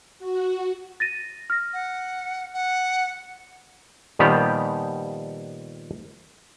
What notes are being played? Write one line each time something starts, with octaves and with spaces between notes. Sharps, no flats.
F#4
A6 A#6 D#7
F6 A#6
F#5
F#5
A#2 D#3 F3 G3 B3 G4